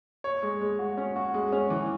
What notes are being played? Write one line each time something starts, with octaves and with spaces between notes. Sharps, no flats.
C#5
G#3
G#3
F#4
C#4
F#4
G#3
C#4
E3